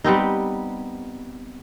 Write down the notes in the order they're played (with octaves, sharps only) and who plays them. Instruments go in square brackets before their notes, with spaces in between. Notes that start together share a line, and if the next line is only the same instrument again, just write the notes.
[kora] G3 B3 C4 D#4